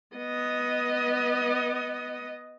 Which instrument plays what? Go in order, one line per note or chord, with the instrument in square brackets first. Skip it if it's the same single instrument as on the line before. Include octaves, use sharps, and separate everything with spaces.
[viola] B3 D#5